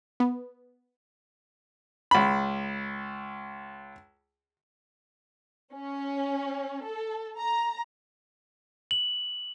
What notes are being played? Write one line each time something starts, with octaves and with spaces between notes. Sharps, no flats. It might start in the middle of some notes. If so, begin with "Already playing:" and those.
B3
C#2 B5
C#4
A4
A#5
F#7